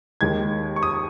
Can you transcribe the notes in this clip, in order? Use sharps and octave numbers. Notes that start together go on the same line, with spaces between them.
D#2 D#3 G#3 G#6
C#6
D#6